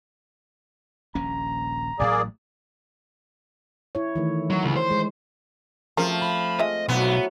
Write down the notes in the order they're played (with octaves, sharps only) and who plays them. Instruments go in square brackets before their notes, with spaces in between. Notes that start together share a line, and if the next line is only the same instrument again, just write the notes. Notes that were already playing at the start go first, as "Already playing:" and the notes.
[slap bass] D#1 A#1 C#4 [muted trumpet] A#5
[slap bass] A1 A2 F#3 [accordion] A#3 G#4 D5
[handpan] E4 C#5
D#3 E3 A3
[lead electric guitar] F#3
C#2
C5
[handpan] G#3
[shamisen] C#3 A#4 [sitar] F3 [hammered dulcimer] A3 C4
[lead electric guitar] B5
[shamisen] G#3 F4 E5 [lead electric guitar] D#5
[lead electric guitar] B1 [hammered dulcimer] F#3 E4 C#6 [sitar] B3